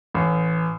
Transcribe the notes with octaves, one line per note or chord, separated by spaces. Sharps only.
A1